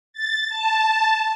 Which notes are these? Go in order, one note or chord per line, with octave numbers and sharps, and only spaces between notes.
A6
A5